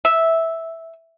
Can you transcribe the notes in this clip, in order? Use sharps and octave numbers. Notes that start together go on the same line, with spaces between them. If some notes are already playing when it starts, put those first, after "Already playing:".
E5